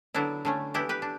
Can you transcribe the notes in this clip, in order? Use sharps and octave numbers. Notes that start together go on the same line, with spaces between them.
D3 F#3 B3 D4 E4
D3 A3 C#4
E3 B3 D4 E4 G4
G4 B4
D4